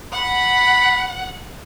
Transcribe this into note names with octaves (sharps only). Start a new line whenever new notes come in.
F#5 B5